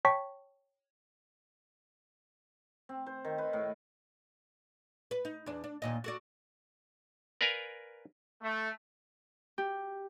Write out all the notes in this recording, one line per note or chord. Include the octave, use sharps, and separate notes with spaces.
C#5 G5 A5 C#6 B6
C4
C5
D#3
B4
A2
B4
D#4
E2 D4
D4
D#2 A#2 D#5
F#4 A4 D5
A#4 B4 D5 F5 G#5 A#5
A3
G4